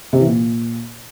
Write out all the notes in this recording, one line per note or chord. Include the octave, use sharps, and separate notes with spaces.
C3
E3
A#2